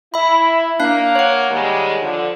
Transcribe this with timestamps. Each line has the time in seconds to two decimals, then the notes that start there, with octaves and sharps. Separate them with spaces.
0.14 E4 E5 B5
0.80 A#3 D4 F5 F#6
1.15 C#5 F#5
1.50 D#3 G3 G#3
2.01 D3 F3